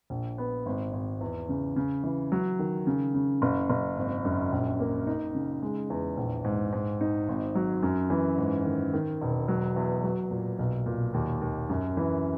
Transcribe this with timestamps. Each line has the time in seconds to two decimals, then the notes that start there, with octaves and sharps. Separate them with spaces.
0.10 A#1
0.38 B3
0.66 G#1
0.93 G#1
1.21 E2
1.49 C#3
1.76 C#3
2.04 E3
2.32 F#3
2.59 D#3
2.87 C#3
3.14 C#3
3.42 F#1
3.70 F#1
3.97 G#1
4.25 F#2
4.52 A#1
4.80 A#3
5.07 D#4
5.35 C#3
5.62 G#3
5.90 E2
6.17 A#1
6.44 G#2
6.73 G#2
7.01 D#4
7.28 G#1
7.55 F#3
7.83 F#2
8.10 E3
8.38 G#2
8.65 D#3
8.93 D#3
9.21 E1
9.48 F#3
9.76 E2
10.03 F#3
10.31 A#2
10.59 B1
10.86 A#2
11.14 D#2
11.41 D#2
11.69 F#2
11.97 E3